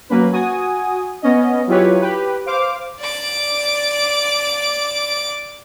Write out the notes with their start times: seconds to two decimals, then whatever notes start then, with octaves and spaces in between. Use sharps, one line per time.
0.09 F#3 A#3 C#4 B4
0.32 F#4 G#5 D#6
1.22 B3 C#4 D#5
1.67 F#3 E4 F4 G4 B4 C#5
2.01 G4 B4
2.46 C5 F5 D6
3.00 D5 D6